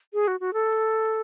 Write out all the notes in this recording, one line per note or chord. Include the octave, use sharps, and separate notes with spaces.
G#4
F#4
F#4
A4